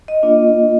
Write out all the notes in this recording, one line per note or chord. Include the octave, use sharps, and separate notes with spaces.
D#5
A#3 D4 F4